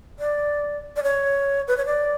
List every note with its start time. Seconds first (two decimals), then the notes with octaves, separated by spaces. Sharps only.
0.19 D5
0.96 D5
1.03 C#5
1.68 B4
1.77 C#5
1.86 D5